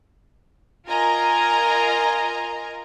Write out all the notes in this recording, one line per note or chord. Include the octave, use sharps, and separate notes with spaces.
F4 A#4 D#5 G#5 A#5